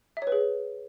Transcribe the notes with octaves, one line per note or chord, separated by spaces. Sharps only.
E5
C#5
B4
G#4